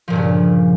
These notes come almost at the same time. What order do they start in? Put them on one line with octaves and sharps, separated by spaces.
F3 A#2 G2 C#3